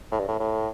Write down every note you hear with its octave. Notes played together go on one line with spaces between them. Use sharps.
A2
G2
A2
A2